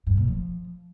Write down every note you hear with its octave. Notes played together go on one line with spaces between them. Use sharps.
G2
A#2
F3